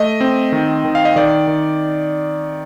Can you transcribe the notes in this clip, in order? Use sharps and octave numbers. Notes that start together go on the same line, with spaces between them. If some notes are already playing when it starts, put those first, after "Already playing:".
Already playing: A3 D#5
C4
D#3
D#3
F5
D#5
D#3 D5
D#3